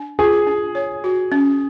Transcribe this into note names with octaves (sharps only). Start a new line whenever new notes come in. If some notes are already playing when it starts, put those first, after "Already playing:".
Already playing: D4
F4 G#4
D4
C#5
F#4
C#4